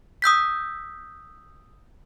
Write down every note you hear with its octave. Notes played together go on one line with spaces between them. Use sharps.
D#6 E6 G6 B6